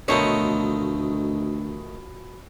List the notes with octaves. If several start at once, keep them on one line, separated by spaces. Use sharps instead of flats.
D2 B2 D#3 F3 A3 D#4 C#5